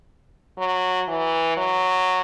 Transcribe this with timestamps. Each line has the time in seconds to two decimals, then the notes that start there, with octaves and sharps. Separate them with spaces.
0.59 F#3
1.08 E3
1.57 F#3